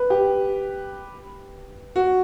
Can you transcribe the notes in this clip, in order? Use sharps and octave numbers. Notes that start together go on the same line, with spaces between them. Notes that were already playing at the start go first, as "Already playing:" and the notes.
Already playing: B4
G4
F#4